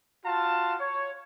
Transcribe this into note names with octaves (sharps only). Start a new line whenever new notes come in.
F4 F#4 F5 A5
C#5